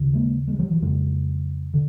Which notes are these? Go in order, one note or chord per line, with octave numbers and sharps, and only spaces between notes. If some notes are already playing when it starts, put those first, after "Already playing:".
Already playing: D#2 C#3
G#3 A#3
G3 A3
G#3
F3 G3
E3 F#3
F2 C#3 F#3 G#3
D3